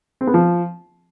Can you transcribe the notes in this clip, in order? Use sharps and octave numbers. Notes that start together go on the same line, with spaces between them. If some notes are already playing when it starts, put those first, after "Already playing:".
C4
B3
F3